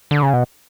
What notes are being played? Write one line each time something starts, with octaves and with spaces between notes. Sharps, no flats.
D3
C#3
B2